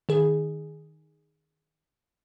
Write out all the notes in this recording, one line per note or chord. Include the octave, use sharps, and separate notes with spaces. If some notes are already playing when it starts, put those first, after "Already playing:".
D#3 G#4